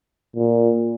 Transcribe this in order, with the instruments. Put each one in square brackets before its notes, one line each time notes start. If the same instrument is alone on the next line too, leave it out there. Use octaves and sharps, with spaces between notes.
[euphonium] A#2